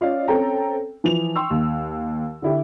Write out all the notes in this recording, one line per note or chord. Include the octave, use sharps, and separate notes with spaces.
C#4 F4 D5 D#5 F5
C4 C#4 A4 G5 A#5
E3 F3 F7
G5 C6 C#6 E6
D#2
D3 E4 G4